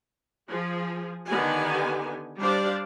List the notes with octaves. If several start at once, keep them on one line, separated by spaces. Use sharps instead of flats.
F3 G#4
D3 D#3 B3 G4 G#5
G3 D4 G4 C5 D5 F5